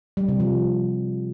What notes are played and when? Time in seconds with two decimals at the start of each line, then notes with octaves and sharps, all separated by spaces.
0.17 G3
0.28 C3
0.40 F3